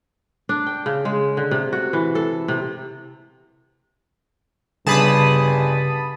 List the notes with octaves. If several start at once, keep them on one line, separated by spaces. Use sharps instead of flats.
D4
G5
C#3
G#3
D3
C3
F#4
E3
A4
C3
G1 G2 C#3 G#4 A5 B5 D#6